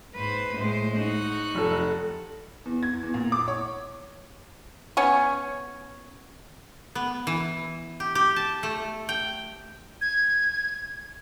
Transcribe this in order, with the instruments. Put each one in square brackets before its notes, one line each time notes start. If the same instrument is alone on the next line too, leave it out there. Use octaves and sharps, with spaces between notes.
[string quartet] G#2 B4 C5
A2 G#3 C5
D#4 F#4 F#6
[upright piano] F1 A4
[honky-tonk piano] E2
G#6
E2
A#2
D6
C#5
[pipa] B3 C#4 C#5
[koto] B3
E3
G4
G4
A5
A3
G5
[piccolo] G#6